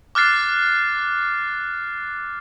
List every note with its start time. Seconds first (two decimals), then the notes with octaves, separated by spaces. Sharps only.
0.15 D6 F6 F#6 A6 C7